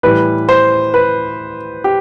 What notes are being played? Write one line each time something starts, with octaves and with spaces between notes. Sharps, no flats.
A2 E3 G3 B4
C5
B4
G4